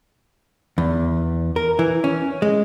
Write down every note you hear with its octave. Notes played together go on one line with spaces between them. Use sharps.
E2
A#4
E3
C#4
G#3